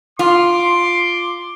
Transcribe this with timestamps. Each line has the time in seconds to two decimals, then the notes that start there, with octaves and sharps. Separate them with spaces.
0.19 F4 C6 D6